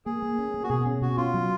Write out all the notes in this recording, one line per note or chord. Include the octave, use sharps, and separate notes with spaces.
A#3 G#4
A#3
C#4
A#3
F#4
B2 G#4
C#4
B2 F#4
C#4 F4
F#3